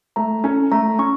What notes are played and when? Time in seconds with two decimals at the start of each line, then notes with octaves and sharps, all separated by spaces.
0.16 A3 A#5
0.44 C#4 A4
0.72 A3 A#5
0.99 C#4 C#6